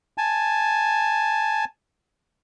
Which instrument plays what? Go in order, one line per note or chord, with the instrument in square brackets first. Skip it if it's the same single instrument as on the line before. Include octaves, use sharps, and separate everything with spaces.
[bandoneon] G#5 A5